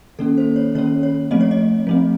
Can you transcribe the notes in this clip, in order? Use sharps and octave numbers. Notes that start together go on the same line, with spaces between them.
D#3 A#3 C#4 A4
C5
C#5
D#3 A#3 C#4 C#5
C#5
F3 A3 C4 D#5
C#5
D#5
F3 A3 C4